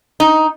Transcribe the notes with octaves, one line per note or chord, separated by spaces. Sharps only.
D#4